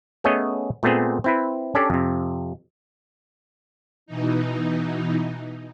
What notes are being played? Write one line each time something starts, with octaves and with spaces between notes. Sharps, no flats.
A3 B3 C#4 G#4 C#5 D#5
A#2 A3 B3 C4 G#4
C4 E4 B4
C#4 D4 G4 A4 D5
F2 C3
B2 E3 D#4